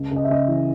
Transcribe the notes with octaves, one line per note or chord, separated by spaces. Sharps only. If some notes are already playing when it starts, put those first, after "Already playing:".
Already playing: C#2
C#2 D#5
E5
C#3 D#5
E3